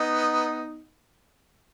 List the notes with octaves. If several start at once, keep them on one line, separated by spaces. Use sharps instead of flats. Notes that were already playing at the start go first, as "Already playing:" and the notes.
Already playing: B3 D#4